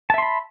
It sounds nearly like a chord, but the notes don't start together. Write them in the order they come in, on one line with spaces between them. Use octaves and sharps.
A5 E5 C6 B5